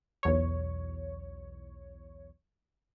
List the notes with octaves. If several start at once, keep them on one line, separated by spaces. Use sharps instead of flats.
B1 E2 C#5